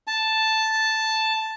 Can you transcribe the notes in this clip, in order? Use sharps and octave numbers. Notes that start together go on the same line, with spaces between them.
A5